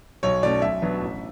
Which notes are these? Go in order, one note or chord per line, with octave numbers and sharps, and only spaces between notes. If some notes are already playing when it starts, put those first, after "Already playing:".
B1 C#5
B2 A3 C#4 D5
B1 E5
B2 F#3 B3 D4
A1